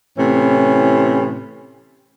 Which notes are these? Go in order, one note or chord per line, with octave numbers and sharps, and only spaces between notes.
A2 C3 E3 C#4